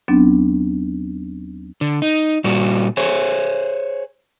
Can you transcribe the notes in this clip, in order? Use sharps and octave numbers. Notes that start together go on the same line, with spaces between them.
D#2 F#3 B3 C4 D4
D3
D#4
A#2 G3 F#4
G#4 C5 C#5